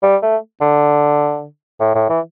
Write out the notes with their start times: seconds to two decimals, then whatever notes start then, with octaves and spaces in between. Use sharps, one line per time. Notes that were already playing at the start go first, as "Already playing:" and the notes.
0.02 G3
0.22 A3
0.61 D3
1.80 A2
1.95 A2
2.10 E3